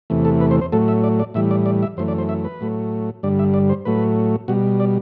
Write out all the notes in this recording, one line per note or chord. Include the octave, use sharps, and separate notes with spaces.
E2 C3 E3 A3
A4
B4
C5
C5
A2 F#3 A3 A4
E5
D5
D5
A2 E3 G3 E5
D5
D5
E5
F#2 E3 A3 C5
D5
C5
E5
B4
A2 F#3 A3
G2 D3 G3 D5
E5
D5
C5
A2 F#3 A3 B4
B2 G3 F#4
D5